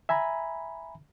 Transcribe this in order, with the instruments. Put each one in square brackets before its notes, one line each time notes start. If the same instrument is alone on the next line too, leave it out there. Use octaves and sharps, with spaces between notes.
[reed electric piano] E5 G#5 A#5 B5